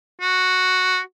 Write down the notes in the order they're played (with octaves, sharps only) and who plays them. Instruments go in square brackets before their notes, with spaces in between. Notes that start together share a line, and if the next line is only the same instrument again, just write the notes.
[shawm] F#4